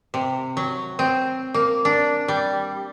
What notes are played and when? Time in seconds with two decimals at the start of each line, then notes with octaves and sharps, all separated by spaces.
0.14 C3
0.57 F#3
0.99 C4
1.54 A#3
1.85 D4
2.28 G3